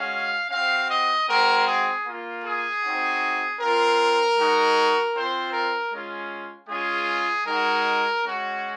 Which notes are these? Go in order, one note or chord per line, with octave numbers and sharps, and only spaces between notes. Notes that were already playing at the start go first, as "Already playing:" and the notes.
Already playing: G#3 C#4 F#4 F5
C4 F#4 F5
D#5
G#3 C4 F#4 A#4
G#4
A#3 F4
G#4
C4 D#4 F#4
C4 F4 A#4
G#3 D#4 F#4
C4 F4 C5
A#4
G#3 C#4 F4
G#3 C#4 F4 G#4
G#3 D#4 F#4 A#4
G#3 C#4 F#4